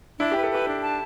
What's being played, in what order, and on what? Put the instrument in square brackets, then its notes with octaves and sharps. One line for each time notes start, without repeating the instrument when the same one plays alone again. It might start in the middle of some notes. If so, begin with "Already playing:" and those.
[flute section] D4 [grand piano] E4
[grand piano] G4 [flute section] B4
[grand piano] A4
[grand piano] G4 [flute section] B4
[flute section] D4
A5